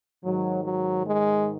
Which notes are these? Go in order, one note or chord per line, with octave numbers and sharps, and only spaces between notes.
G#2 D#3 F#3
F#3
G#3